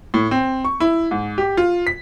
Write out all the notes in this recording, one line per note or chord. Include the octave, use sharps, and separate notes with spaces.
A2
C4
C#6
E4
G#2
G4
F4
B6